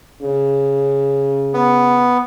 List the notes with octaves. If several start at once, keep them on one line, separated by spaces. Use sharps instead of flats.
C#3
B3